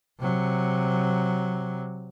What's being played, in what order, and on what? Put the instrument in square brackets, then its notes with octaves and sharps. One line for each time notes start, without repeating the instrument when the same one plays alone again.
[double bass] C3 F#3